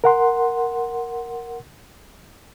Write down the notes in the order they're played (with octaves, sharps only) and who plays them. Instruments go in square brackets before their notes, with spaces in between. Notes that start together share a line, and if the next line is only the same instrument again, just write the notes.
[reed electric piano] A#4 F#5 C6